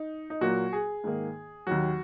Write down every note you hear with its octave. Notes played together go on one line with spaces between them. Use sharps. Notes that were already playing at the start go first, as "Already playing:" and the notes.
Already playing: D#4
D#4
A#2 F#3 A#3 F#4
G#4
G#2 D#3 A#3
D#2 D#3 F#3 F#4